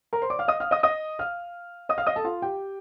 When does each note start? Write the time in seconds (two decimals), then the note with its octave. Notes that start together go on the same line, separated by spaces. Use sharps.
0.13 A#4 A#5
0.22 C5 C6
0.30 D5 D6
0.39 F5 F6
0.48 D#5 D#6
0.60 F5 F6
0.71 D#5 D#6
0.83 D#5 D#6
1.19 F5 F6
1.89 D#5 D#6
1.98 F5 F6
2.07 D#5 D#6
2.16 A4 A5
2.24 F4 F5
2.42 G4 G5